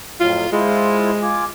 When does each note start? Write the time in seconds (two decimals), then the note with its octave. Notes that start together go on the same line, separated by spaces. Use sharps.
0.20 F2 A2 F#3 F4
0.52 G#3 E4 F4 C5
1.22 F4 G#5 D6